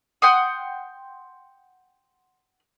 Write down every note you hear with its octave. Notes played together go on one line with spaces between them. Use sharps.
F#5 G5 C6 D#6